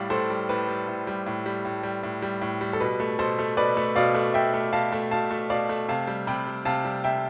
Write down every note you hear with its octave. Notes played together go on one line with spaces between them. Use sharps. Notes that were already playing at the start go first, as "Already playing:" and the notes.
Already playing: A2 G3 D5 F5
A2 A4 C5
G3
A2 B4
G3
A2
G3
A2
G3
A2
G3
A2
G3
A2
G3
A4
B2 B4
A3
B2 A4 C5
A3
B2 B4 D5
A3
B2 D5 F5
A3
B2 E5 G5
A3
B2 F5 A5
A3
B2 F5 A5
A3
B2 D5 F5
A3
C3 F5 A5
G3
C3 G5 B5
G3
C3 F5 A5
G3
C3 E5 G5